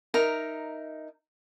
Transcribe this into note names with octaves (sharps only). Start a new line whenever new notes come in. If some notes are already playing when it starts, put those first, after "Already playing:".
D#4 A#4 E5 A#5